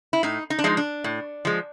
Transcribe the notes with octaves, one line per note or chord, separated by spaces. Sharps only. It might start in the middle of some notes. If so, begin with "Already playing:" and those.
E4
A2 D#4
D#4
D4
F3 G#3 D#4
D4
A2
F3 G#3